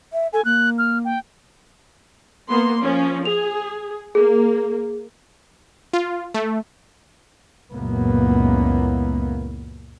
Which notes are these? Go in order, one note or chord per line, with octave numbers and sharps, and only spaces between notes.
E5
A4 G#5
A#3 F#6
F6
G5
A#3 B3 C6
F3 C#4
G#4 F7
A#3 G#4
F4
A3
C#2 F#2 A#2 E3 A#3 B3